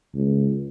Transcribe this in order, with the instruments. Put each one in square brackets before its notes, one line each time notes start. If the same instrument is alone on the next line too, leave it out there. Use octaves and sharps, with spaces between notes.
[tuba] C#2